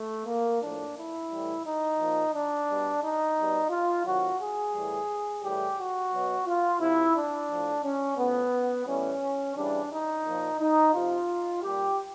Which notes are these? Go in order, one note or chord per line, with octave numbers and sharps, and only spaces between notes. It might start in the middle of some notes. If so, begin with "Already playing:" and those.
Already playing: A3
A#3
A2 F3 D4
E4
A2 E3 G3
D#4
A#2 F3
D4
B2 G3
D#4
B2 G3
F4
C3 D#3 F#3 F#4
G#4
A2 E3 G3
A2 E3 G3 G4
F#4
B2 F#3
F4
C3 F3 E4
D4
A2 F3
C#4
A2 F3 B3
A2 E3 G3 C#4
C#3 E3 G3 D4
D#4
A#2 F3
D#4
C3 F3 F4
A#2 G3 G4